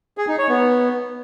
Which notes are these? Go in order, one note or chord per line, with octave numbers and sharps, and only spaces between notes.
G#4
D#4
C#5
B3